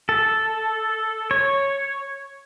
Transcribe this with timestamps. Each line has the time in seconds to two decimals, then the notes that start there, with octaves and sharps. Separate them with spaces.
0.09 A4
1.31 C#5